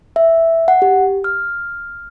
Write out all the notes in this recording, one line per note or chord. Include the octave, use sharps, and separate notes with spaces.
E5
F#5
G4
F6